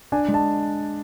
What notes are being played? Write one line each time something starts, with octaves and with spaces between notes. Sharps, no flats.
D4 G#5
G#3
A5